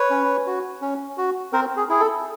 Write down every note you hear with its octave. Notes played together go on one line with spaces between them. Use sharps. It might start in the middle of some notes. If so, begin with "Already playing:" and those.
Already playing: B4 C#5
C#4
F#4
C#4
F#4
C4 A#4 C5
G#4
E4 G#4
A4